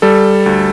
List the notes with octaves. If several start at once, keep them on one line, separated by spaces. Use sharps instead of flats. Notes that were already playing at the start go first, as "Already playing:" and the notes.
G3 A4
D2